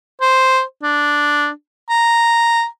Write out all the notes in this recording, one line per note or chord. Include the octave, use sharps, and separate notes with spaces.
C5
D4
A#5